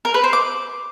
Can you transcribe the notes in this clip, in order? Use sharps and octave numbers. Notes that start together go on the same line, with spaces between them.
A#4
B4
C5
D6